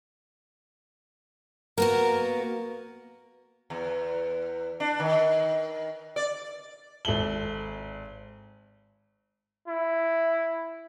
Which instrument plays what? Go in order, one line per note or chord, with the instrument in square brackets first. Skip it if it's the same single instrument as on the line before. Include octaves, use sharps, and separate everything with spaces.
[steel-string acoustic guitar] A#3 B3 F#4 [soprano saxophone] A#4
[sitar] E2
D4
D#3
D5
[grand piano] G#1 A4 E5 F#7 G7
[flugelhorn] E4